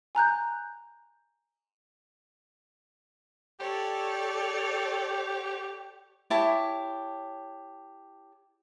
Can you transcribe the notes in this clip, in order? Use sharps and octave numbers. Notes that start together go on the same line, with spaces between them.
G#5 A#5 F#6 G6
G4 A4 C#5 D5
E4 G4 C#5 A5